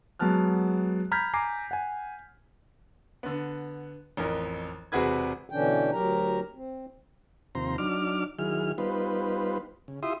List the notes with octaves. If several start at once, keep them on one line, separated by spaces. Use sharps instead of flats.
F#3 G#3 B3 A5 F6 F#6
A#5 B5 F6 G6 G#6 B6
G#5 A#5 D6 C7
F#5 G#5
D3 B3
A1 F2 A#4
E1 C3 F#4 G#4 B4 G#6
B2 D3 E3 C#4 D4 G5
D2 F#3 G4 A#4 A#5
C4
D#2 C3 F3 C4 A#5 C6
F#3 D4 D#4 D6 F6
D#3 F#3 E4 G#4 F6
G3 B3 D#4 F4 B4 C5
C#3
E4 F4 G4 E5 C6 D#6